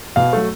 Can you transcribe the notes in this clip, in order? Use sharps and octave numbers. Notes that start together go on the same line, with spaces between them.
B2 F5
F#3 A3